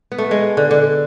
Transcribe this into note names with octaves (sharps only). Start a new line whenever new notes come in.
B3
A3
G#3
D3
D3